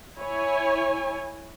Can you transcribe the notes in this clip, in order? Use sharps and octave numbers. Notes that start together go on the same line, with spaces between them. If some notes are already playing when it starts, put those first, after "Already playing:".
E4 C#5 G#5